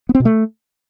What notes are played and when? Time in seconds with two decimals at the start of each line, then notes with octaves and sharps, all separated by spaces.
0.09 B3
0.15 C4
0.20 B2
0.25 A3